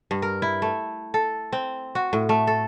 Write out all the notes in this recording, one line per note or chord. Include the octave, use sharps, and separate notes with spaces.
G2
A#4
E4
A3
A4
C4
F#4
A2
A3
A4